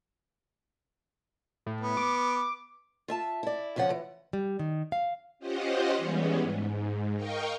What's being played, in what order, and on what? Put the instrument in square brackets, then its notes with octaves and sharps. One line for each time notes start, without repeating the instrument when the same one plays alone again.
[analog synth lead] A2
[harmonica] B3
[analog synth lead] D6
[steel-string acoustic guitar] F4 E5 A5
E4 D5
F2 C#3 F3 C#4 F#5
E3
[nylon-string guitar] G3
D#3
F5
[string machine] C#4 F4 G4 C5 D#5 F#5
E3 G3 G#3 B3 C#4
G#2
A#4 D#5 F5 G5 C#6